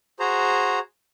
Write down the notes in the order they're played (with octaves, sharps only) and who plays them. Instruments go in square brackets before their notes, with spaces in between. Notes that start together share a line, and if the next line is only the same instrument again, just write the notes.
[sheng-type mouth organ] F#4 G#4 C5 A#5